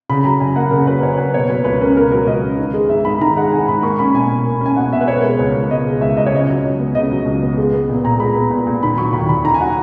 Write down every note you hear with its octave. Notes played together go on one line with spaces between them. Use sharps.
C#3 B5
F#3 A#5
F#2 G#5
A#3 F#5
C#3 A#4
F#3 B4
F#2 C#5
A#3 B4
B2 C#5
F#3 B4
C#2 B4
C#4 A#4
B2 A#4
F#3 A#4
C#2 D#5
C#4
D#3
G#3
G#2 E5
G#2 B5
D#3 A#5
G#3 F#5
G#2 G#5
G#2 B5
A#3 C#6
C#4 B5
B2 G#5
B2
A#3
C#4 G#5
B2 F#5
B2 E5
B4
B2 C#5
A#4
G#3 B4
C#2
C#2
B2 D#5
G#3
C#2 E5
C#2 D#5
C#5
C#3 D#5
F#3
C#2
B3
C#3 D#5
F#3
C#2
B3
G#3
B3
A#2
A#2 A#5
G#3 B5
B3
A#2
A#2
D#3 B5
F#3 C#6
D#2 B5
D#2 B5
D#3 A#5
G#5
F#3 F#5